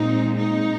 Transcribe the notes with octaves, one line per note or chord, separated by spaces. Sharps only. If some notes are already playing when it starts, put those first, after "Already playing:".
Already playing: A#2 G#3 C4 D#4
D#4